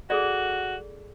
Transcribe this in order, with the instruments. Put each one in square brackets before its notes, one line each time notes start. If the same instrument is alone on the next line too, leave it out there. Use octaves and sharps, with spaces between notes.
[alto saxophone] F#4 [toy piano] G#4 A4 D5